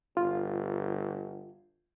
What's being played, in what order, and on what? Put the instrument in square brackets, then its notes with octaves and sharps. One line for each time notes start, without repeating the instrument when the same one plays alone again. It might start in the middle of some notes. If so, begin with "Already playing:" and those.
[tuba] G1 [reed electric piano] F4